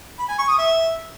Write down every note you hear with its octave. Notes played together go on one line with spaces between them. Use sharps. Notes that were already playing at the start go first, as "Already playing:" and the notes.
B5
G#5
C#6
D#6
E5